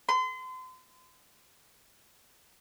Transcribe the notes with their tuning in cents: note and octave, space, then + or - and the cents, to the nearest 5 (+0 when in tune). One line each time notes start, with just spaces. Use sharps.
C6 -35